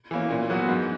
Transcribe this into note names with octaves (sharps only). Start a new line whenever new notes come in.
E3 A#3 C#4
A#2
F#3 B3 F#4
G#2